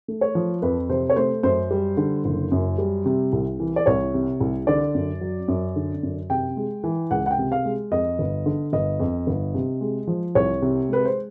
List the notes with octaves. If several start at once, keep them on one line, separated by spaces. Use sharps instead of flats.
A3
C#5
F3
F2 B4
C3 C5
C#5
A3 C5
F#2 C5
G3
D3
F#1
F#2
G3
C3
C2
E3
D5
C2 C#5
C3
C2
D3 D5
F#2
F#3
F#2
D3
F#2
C3 G5
G#3
E3
C#2 F#5
F#5
G5
C3
F5
G#3
F2 D#5
G1
D3
G1 D#5
F2
G1
C3
G#3
F3
C2 C#5
C3
G#3 B4
C5